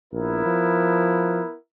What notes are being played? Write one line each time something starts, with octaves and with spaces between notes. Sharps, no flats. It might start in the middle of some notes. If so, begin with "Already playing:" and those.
A#1 B3 E4 A#4
F3